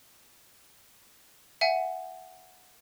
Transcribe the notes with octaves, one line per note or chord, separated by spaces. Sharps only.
E5 F#5 G#5